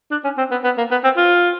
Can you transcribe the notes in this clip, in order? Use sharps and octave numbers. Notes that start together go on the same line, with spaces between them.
D4
C#4
C4
B3
B3
A#3
B3
C4
F4